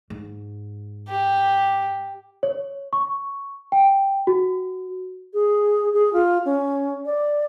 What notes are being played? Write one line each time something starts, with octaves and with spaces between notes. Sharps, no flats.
G#2
G4
C#5
C#6
G5
F#4
G#4
G#4
F4
C#4
D5